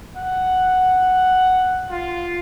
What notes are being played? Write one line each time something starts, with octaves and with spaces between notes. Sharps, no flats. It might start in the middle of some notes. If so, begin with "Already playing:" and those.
F#5
F4